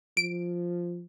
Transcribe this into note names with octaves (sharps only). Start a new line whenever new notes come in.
F3 D7